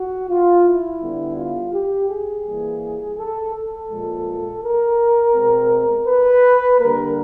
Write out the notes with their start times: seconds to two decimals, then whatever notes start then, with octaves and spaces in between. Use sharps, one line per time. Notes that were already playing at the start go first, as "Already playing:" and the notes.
Already playing: F#4
0.29 F4
0.65 E4
1.01 D3 G3 B3
1.38 F4
1.74 G4
2.09 G#4
2.46 E3 G3 A#3
3.19 A4
3.54 A4
3.90 A#2 F3 G#3
4.63 A#4
5.35 B2 G#3 C4
6.08 B4
6.80 D3 G3 A#3 A#4